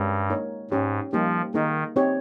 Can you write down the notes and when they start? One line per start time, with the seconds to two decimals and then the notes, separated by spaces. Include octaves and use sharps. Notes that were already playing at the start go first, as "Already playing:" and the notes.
Already playing: G2 G#3 C#4 G4 A#4 C#5
0.30 A#3 D#4 A#4 C#5
0.71 G#2 C#4 G4 C#5
1.13 F3 G3 A#3 D#4 G4
1.54 D#3 A#3 D#4 G#4
1.96 C4 D#4 G4 C#5